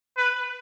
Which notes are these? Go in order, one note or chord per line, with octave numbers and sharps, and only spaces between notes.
B4